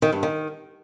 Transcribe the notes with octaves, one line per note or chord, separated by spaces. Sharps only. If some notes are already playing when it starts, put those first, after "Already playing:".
D#3
G2
D#3